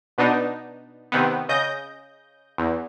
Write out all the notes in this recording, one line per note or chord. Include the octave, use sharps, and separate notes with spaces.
B2 B3 D4 D#4
C3 D#3 B3
C#3 D#5 G6 A#6
E2